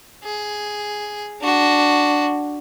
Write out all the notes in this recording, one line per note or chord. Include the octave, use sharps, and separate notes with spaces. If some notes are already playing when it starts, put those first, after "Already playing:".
G#4
D4 F#4